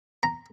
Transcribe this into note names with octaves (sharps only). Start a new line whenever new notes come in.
A#5